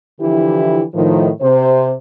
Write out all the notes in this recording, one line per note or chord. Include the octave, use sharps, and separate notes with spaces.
D3 E3 F3 E4 G4
A2 D#3 F3
C3 C5